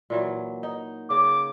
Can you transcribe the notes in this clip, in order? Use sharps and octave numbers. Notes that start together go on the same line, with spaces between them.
A#2 E3 F#3
D#4
C#3 D6